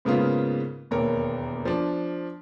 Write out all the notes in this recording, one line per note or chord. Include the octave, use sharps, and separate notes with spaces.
G#2 C#3 A#3 B3 F4
E1 D#2 A#3 A#4 C#5
F3 D4